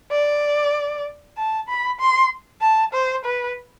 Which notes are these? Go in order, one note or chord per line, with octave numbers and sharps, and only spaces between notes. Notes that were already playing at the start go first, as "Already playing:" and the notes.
D5
A5
B5
C6
A5
C5
B4